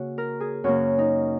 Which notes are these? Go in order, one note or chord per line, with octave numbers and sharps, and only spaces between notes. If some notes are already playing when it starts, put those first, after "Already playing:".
Already playing: C#3 A#3 F#4
A#4
G#4
F#2 C#3 A#3 F#4
D#4